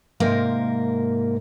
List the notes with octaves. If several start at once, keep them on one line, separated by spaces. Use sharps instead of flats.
G#2 C3 A#3 A#4 F5